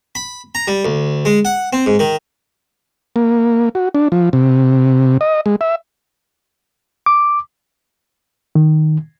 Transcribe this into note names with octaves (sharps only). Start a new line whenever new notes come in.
B5
A#5
G3
D2
G#3
F#5
C4
G#2
D#3
A#3
F#4
D4
F3
C3
D#5
G#3
E5
D6
D#3